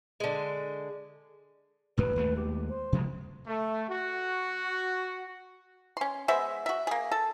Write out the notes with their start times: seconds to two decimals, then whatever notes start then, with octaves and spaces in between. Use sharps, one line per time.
0.20 D3 G#3
1.97 A1 G2 G3 B4
2.16 D#2 G#3 A3
2.36 G4
2.69 C5
2.92 C3 F3 G#3
3.46 A3
3.88 F#4
5.97 C#4 C6
6.28 G#3 B3 C5 E5
6.66 F#4 E5
6.87 A#3 G#4
7.12 A4